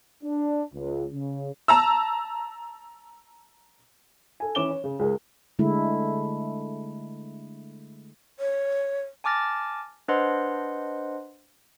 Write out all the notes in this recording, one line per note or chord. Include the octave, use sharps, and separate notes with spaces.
D4
C#2
C#3
A5 A#5 E6
A4 G#5
E3 C#4 D6 E7 G7
C#5
C#3
C#2 G#3 G#4 A#4
D3 G#3 A3 E4
C#5
G#5 A5 D6 F6 A6 A#6
D4 B4 C5 D#5 F#5 C6